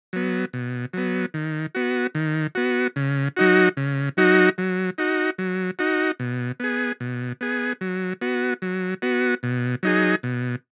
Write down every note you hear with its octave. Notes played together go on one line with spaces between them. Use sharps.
F#3 B3
B2
F#3 B3
D#3
B3 F#4
D#3
B3 F#4
C#3
F#3 D#4 F#4
C#3
F#3 D#4 F#4
F#3
D#4 F#4
F#3
D#4 F#4
B2
B3 G#4
B2
B3 G#4
F#3
B3 F#4
F#3
B3 F#4
B2
F#3 D#4 G#4
B2